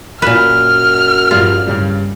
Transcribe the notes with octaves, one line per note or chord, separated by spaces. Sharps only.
F#2 A#2 B4 F6 E7
G2 F3 G3 F4
G2 C#3 G3